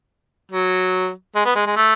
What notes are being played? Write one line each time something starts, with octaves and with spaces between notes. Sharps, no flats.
F#3
G#3
B3
G#3
G#3
A3